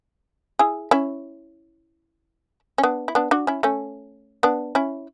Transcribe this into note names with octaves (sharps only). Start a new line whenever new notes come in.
E4 G#4
C#4 E4
C#4
B3 D4
E4
B3 D4
D4 F#4
C#4 E4
A3 C#4
B3 D4
C#4 E4